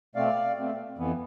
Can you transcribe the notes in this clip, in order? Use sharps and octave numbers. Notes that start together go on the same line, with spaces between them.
B2 A3 C4 D5 F5
B2 A3 C4
F2 E3 B3